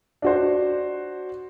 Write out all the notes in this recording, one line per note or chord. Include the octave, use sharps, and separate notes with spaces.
D4 F#4 C5